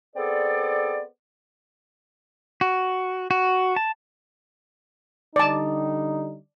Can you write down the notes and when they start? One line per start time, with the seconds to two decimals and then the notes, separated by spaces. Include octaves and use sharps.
0.16 B3 C4 G#4 A4 C5 D5
2.61 F#4
3.31 F#4
3.76 A5
5.36 D3 G3 D#4 D5 A5